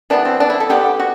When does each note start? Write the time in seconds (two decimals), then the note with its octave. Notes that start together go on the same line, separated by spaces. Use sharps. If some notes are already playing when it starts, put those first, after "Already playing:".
0.10 E3 G3 B3 D4
0.25 C4
0.40 D4
0.50 E4
0.60 A4
0.70 D3 G3 B3 G4
1.00 F#4